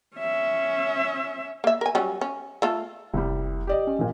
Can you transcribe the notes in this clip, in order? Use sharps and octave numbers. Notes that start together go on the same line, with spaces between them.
C#4 E5
A#3 E5
A#4 G#5
F#3 G3 C#4
C#4
A3 F4 A4
F1 C2 G3
G4 D5 D#5
C#4
A#1 A#2